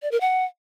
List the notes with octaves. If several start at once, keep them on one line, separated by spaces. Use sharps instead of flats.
D5
A#4
F#5